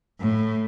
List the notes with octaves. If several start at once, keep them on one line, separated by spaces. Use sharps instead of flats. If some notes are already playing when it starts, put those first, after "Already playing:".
A2